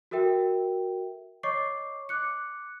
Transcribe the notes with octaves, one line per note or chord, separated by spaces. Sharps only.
F#4 A4 A#4 E5 G5
C#5 D#5 C#6 D6 C7
D6 F#6 C#7